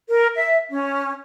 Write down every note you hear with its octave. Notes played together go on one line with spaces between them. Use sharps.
A#4
E5
C#4